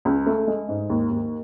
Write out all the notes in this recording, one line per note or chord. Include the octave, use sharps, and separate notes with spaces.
C#2
A3
G#3
G#2
D#2
D#2